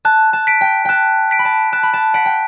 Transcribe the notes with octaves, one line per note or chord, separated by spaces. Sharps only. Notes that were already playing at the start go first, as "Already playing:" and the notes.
A5 F#6
A5
B6 D7
G5
G5 A5 F#6
B6 D7
B5
A5
A5 F#6
B5
A5
F#5 B6 D7
G5